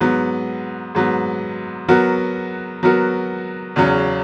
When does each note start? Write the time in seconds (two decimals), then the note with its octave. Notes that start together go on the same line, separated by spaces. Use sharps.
0.01 G#2 F#3 B3
0.95 G#2 F#3 B3
1.88 F#3 B3 F#4 A#4
2.83 F#3 B3 F#4 A#4
3.76 E2 C#3 F#3 C#4